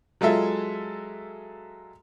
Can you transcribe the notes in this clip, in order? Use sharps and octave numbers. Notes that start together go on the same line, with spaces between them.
F#3 G#3 F4 A4 E5